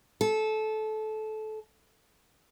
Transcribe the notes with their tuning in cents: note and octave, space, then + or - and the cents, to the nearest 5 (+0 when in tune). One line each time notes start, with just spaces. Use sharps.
A4 -20